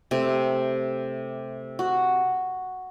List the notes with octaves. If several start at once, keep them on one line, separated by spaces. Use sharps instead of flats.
C3 A3
F#4